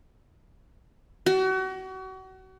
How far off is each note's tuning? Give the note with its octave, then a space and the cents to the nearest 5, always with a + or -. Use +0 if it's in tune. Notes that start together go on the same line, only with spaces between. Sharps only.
F#4 +35